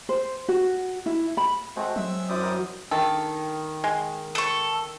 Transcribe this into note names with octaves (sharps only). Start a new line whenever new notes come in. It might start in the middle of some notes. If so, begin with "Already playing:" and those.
C5
F#4
E4
B5
G#3 A3 C4 F#4
F#3 E5
F#2 E4 C5 D5 D#6
A#4
D#3 A4
G#3
A4 C#6